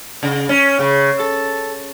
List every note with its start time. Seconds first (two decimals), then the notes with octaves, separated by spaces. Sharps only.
0.23 C#3
0.49 C#4
0.79 C#3
1.19 A4